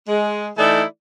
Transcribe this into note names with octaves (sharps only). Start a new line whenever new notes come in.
G#3
E3 A3 D#4 E4 A4 D5